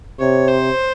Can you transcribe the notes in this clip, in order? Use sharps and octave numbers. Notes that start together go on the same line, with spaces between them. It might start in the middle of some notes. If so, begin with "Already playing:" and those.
C3 C#5
C5